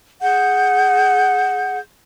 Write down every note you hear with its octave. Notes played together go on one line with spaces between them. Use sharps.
G#4 F#5 G6